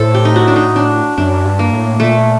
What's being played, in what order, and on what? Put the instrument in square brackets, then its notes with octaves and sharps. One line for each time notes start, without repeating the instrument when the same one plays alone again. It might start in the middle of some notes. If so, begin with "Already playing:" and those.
Already playing: [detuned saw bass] A2 [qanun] A4 C5
[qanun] G4
D#4
F#4
D4
D#4
D4
[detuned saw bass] F#2 [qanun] D4
[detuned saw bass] G2
[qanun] A#3
[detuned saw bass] A2
[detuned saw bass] A#2 [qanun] A3